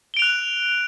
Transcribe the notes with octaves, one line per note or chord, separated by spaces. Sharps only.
F#6 D7 F7 G7